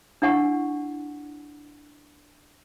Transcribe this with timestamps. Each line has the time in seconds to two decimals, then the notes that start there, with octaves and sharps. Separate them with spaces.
0.22 D4 E4 F#5 G#5 C#6